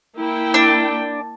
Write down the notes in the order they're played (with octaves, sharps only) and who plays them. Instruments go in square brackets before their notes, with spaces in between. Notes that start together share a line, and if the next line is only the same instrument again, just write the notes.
[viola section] A#3 E4 G5
[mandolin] D4